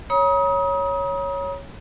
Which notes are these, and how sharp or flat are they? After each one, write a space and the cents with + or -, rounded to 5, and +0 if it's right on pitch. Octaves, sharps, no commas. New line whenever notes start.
C#5 +0 A#5 +45 D#6 +25